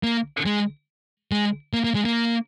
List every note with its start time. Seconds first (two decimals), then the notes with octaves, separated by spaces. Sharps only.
0.03 A#3
0.46 G#3
1.32 G#3
1.73 A#3
1.84 A#3
1.95 G#3
2.05 A#3